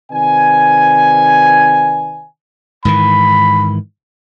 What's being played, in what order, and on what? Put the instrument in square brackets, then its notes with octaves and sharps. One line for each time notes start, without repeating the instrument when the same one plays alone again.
[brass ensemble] C3 D#3 B4 D5 G#5
[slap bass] G#2 D#3 E3 [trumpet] B5